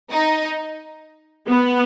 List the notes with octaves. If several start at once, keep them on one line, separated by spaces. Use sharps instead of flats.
D#4
B3